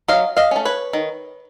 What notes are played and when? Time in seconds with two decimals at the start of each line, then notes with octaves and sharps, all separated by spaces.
0.08 F#3 D#5 F5
0.37 D#5 F5
0.51 A3 C#4
0.65 B4 C#5
0.93 D#3